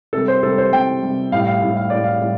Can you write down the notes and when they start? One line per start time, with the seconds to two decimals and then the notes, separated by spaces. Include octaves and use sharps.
0.13 C3 G3 A4
0.28 C5
0.43 C3 A4
0.47 G3
0.58 C5
0.72 C3 G3 G5
1.03 C3 G3
1.32 A2 G3 F5
1.47 F5
1.62 A2 G3
1.77 F5
1.90 A2 G3 D5
2.04 F5
2.22 A2 G3